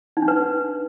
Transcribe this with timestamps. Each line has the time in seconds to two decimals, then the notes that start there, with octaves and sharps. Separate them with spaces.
0.17 D#4
0.22 D4
0.28 B4